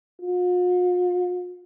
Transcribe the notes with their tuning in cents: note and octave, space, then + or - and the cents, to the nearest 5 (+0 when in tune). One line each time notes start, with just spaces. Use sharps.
F4 +45